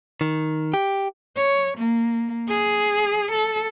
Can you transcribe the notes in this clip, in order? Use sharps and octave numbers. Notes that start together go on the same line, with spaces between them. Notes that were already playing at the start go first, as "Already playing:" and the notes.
D#3
G4
C#5
A#3
G#4
A4